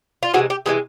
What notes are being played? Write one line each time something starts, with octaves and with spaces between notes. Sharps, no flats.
F4
C3 E3 G#3 F#4
G4
C3 E3 G#3 G#4